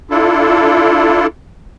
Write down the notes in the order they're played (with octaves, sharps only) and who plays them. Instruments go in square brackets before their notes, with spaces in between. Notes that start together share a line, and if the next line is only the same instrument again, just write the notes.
[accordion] D4 E4 F4 A4